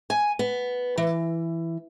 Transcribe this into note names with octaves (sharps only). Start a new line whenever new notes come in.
G#5
B3
E3